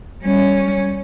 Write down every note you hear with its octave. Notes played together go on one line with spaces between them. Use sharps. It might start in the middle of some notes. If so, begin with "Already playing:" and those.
G3 C#4